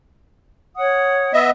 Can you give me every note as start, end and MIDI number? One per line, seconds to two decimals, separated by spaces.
0.77 1.31 73
0.77 1.31 78
0.77 1.31 87
1.33 1.51 59
1.33 1.51 75
1.33 1.51 76